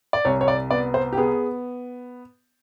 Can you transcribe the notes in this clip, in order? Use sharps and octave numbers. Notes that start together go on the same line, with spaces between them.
D5
C2 C#5
C#5
D5
B3 D5
C5
G4
B3 G#4